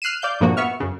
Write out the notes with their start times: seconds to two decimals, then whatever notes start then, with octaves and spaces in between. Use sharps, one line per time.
0.02 F6 F#6 C7 D#7 E7
0.22 D5 F5 G6
0.40 G2 A#2 F3 A#3 F#4
0.57 B3 E5 C#6 F6
0.80 F#2 C#3